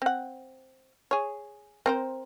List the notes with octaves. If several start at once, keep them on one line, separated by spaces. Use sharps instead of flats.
C4 F#5
G#4 C#5
C4 A#4 C5